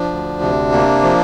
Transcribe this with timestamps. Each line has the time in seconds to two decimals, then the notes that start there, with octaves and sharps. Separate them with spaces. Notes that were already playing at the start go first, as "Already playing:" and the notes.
Already playing: F3 D4
0.10 D2
0.42 C3
0.72 A#3
1.03 F3